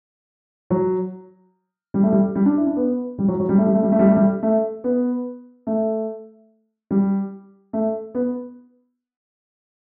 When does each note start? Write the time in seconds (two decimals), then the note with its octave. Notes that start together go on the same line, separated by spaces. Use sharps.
0.70 F#3
1.94 G3
2.03 A3
2.12 G3
2.35 G3
2.46 D4
2.57 E4
2.67 D4
2.77 B3
3.19 G3
3.28 F#3
3.40 F#3
3.49 G3
3.58 A3
3.67 G3
3.74 A3
3.83 G3
3.92 A3
3.99 G3
4.08 A3
4.16 G3
4.43 A3
4.84 B3
5.67 A3
6.91 G3
7.73 A3
8.15 B3